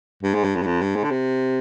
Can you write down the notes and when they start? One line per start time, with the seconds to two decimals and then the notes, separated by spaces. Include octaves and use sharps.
0.23 G2
0.34 G#2
0.44 G2
0.55 F2
0.62 G2
0.66 F2
0.81 G2
0.96 G#2
1.03 D3
1.10 C3